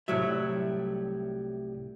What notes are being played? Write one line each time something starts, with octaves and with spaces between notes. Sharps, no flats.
C2 A2 F#3 G3 E5